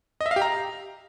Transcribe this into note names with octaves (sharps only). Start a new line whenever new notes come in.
D#5
E5
F5
G4
A#5